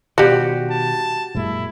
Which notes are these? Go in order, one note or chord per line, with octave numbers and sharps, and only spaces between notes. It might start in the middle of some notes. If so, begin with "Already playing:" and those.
B2 D#3 F3 G3 F#4 G4
A5
F#2 A#2 G#3 E4